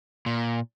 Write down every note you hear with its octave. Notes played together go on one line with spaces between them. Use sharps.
A#2